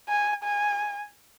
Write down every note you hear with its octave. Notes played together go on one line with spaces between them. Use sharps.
G#5
G#5